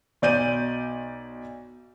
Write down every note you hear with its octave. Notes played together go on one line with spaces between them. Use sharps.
B1 D5 G6 D#7